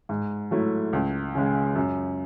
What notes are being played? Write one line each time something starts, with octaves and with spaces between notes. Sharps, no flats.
G#2
F#3 A3 E4
C#2
C#3 G#3
F#2